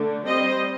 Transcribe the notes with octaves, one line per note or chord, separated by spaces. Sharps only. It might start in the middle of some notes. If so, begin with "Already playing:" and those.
Already playing: D3 A3 D4
G3 C4 C5 D#5